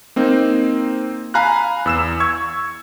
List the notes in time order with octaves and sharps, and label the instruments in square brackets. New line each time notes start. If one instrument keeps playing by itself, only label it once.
[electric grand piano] A#3 C4 D#4
F5 G#5 A#5 B5 F6 F#6
E2 E6 E7
C#6 E6 G#6